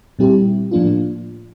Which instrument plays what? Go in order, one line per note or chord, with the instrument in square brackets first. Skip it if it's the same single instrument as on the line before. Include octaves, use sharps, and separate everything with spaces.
[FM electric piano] A#2 G3 C4 E4 G4
A2 F3 A#3 D4 F4